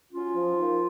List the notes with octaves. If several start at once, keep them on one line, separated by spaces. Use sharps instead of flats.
F#3 C#4 F4
F3
A#3 D#4